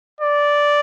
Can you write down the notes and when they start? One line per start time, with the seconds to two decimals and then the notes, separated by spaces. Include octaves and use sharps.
0.21 D5